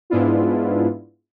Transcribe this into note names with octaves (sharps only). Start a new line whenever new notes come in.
G#2 G#3 B3 D4 E4 F4